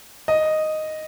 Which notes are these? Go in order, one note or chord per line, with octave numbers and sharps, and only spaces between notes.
D#5